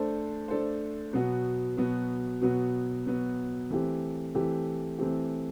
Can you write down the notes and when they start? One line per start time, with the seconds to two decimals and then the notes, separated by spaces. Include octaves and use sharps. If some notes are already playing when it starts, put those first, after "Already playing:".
Already playing: A3 D4 A4 C5
0.48 A3 D4 A4 C5
1.13 B2 F#3 B3 F#4
1.77 B2 F#3 B3 F#4
2.41 B2 F#3 B3 F#4
3.06 B2 F#3 B3 F#4
3.71 E3 A3 C4 G4
4.35 E3 A3 C4 G4
4.98 E3 A3 C4 G4